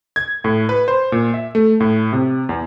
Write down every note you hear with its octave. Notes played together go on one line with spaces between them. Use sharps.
G#6
A2
B4
C5
A#2
E5
A3
A2
C3
E2